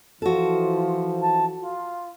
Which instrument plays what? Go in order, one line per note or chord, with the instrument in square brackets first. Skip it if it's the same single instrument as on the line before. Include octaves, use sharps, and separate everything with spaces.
[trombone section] E3 F3 [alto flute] F4 [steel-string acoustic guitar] F#4 A4
[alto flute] A5
F4